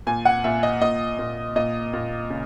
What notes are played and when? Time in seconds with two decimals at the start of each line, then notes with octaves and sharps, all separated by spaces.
0.07 A#2 G#5
0.25 F#5
0.44 A#2 E5
0.63 D#5
0.81 A#2 D#5
1.19 A#2
1.56 A#2 D#5
1.93 A#2
2.30 C#3